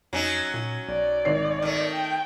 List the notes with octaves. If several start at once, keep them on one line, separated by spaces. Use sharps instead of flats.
F2 F#3 C#4 D#4
A#2
B1 D5
G#1 C#5 C7
D#3 A3
G5